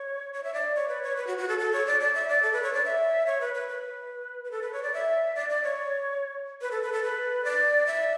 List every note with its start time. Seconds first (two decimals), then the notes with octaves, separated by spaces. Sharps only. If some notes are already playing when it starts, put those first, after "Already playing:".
Already playing: C#5
0.33 C#5
0.44 E5
0.54 D5
0.75 C#5
0.88 B4
1.03 C#5
1.16 B4
1.27 F#4
1.38 F#4
1.48 A4
1.59 A4
1.73 C#5
1.86 D5
2.00 D5
2.15 E5
2.28 D5
2.43 A4
2.53 B4
2.63 C#5
2.73 D5
2.85 E5
3.26 C#5
3.41 B4
3.54 B4
3.68 B4
4.44 B4
4.51 A4
4.62 B4
4.73 C#5
4.83 D5
4.94 E5
5.35 D5
5.50 D5
5.63 C#5
6.61 B4
6.71 A4
6.82 B4
6.93 A4
7.03 B4
7.45 D5
7.87 E5